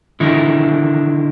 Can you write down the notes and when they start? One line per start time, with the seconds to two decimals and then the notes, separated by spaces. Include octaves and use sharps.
0.20 D3 D#3 E4